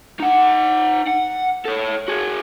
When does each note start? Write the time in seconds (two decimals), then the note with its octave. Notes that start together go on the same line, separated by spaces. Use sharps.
0.20 D#4 F#5
1.08 F#5
1.66 A4 C#5
2.08 F#4 G#4